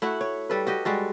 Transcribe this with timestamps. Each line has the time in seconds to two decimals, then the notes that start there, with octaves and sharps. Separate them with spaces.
0.02 A3 E4 F#4 F#5
0.21 C#5
0.50 G3 A4 B4
0.67 F#4 G4 D#5
0.85 G3 G#3 F#4 A4